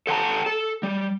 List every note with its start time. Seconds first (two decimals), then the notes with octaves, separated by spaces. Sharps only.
0.07 A4 F#5 G5 A5 A#5
0.46 A4
0.83 G3